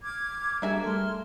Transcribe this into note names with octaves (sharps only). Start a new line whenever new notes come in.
D6 F6 G#6
G3 A#3 D4 F#4 G#4 E5 G#5 A5
G3 A3 A4 C6 F6